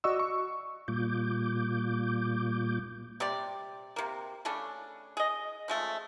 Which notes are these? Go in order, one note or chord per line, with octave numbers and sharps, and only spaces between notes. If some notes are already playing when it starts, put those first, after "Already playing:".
F#4 D5 D#5 C#6 E6
C#6
A#2 G3 A#3 F4 D6 G6
C3 G4 D5
C3 A#3
C#3 A3 C#4 D4
G#4 D#5
F3 G#3 A3 C#4